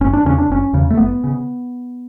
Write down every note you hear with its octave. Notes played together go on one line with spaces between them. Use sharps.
F#1 C#4
D4
E2 C#3 C#4
D4
F#1 C#4
E2 C#3
A3
F#1 B3
C#3